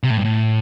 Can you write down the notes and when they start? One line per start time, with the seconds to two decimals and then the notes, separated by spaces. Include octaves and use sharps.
0.03 C3
0.10 A2
0.18 G2
0.25 A2